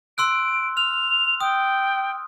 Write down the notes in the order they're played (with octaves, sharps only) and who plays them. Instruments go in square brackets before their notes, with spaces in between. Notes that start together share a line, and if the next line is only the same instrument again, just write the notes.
[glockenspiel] C6 E6 F#6 [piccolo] D7
[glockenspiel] F6 [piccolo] F7
[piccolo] G5 [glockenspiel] D#6